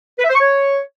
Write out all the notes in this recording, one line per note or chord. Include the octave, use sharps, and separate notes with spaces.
B4
E5
C5
C#6
C#5